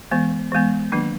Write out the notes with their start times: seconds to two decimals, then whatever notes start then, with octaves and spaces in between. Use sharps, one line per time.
0.11 E3 G#3 B3
0.52 E3 G#3 B3
0.92 D#3 F#3 A#3 D4